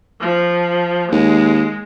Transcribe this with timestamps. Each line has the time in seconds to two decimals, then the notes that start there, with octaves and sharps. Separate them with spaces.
0.21 F3
1.12 D#2 G#3